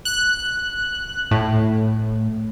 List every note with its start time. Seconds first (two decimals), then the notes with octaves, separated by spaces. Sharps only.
0.05 F#6
1.31 A2